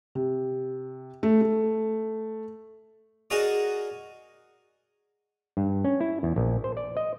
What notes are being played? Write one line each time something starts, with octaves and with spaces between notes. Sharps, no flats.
C3
A3
A3
D#4 F#4 G#4 A#4 D5 C#6
G2
C#4
E4
E2
A#1
C5
D5
D#5